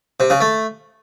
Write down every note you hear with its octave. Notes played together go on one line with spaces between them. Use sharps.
C3
C#3
A3